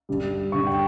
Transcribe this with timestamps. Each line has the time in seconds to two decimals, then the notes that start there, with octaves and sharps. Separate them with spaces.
0.09 G2 D3 G3
0.52 G2 D3 G3 C#6
0.67 G5